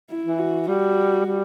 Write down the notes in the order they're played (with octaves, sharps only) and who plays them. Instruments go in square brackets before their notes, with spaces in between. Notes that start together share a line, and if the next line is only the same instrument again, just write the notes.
[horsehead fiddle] E4
[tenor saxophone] E3
[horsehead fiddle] F#4
[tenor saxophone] G3 [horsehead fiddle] F#4
[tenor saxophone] G3